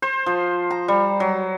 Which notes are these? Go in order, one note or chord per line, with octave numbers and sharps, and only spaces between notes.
C5
F3
A#5
G3
F#3